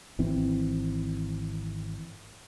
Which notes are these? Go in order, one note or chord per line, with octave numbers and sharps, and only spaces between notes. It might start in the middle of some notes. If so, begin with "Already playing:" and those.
G#1 E3 C4